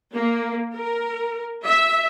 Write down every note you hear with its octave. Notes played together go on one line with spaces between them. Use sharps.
A#3
A#4
E5